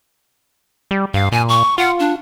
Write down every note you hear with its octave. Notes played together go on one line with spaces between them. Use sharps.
G3
G2 F5
A#2 G#5
C#6
F4 F#5
D4